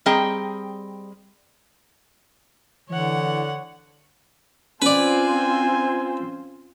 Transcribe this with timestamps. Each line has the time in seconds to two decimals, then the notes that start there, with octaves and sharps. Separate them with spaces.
0.06 G3 C4 G#4 D#5 G5 A#5
2.89 D3 E3 C#5 F#5
4.82 C4 C#4 F4 B4 C5 D5 G#5